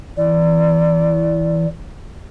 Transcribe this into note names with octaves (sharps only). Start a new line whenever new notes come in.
E3 D5